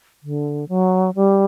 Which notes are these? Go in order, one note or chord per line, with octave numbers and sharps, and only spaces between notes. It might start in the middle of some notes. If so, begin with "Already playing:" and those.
D3
F#3
G3